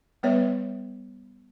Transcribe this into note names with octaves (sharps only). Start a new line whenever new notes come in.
G3 B3 B4 C#5 E5